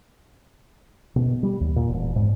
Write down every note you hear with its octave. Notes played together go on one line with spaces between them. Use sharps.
B2
G3
D#2
A#2
E1
G#2